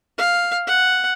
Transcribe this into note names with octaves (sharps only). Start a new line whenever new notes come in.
F5
F#5